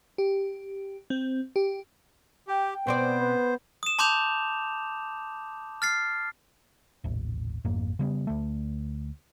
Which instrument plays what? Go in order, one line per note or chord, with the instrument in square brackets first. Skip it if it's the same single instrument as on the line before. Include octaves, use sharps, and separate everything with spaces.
[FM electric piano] G4
C4
G4
[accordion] G4 [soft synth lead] G5
[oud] B2 C4 D5 [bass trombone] B3 [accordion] C5
[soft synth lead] B4
[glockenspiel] D#6 E7
A5 C6 D6 D#6 G6 F7
F6 A6 C7
[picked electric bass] D#1 A1
G#1 F2 G#2 A#3
C#3 G3 B3
D2 A3